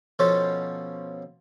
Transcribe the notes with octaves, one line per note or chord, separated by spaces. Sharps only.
B2 F3 C#4 A4 C5